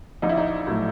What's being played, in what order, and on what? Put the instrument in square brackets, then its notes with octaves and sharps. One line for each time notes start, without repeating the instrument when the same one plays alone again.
[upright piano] A#1 D#4
E4
D#4
A2 F#3 A3